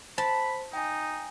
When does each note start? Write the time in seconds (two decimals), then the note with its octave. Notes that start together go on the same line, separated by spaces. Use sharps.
0.18 C5 A5 B5
0.73 D#4 G5 G#5